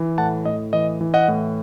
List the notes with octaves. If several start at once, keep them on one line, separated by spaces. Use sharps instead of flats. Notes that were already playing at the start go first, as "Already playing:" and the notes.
Already playing: E3
A2 F#5 A5
A2 D#5
E3 D#5
E3
D#5 F#5
A2